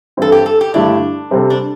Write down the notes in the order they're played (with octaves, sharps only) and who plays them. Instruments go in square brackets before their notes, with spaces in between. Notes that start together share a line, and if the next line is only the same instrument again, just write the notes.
[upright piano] G2 E3 C4 E4 [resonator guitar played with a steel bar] A4
[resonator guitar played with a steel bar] G4
A4
G4
[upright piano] G2 D3 A3 E4 G4 [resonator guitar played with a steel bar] D4
[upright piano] C3 G3 C4 A4
[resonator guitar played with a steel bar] D4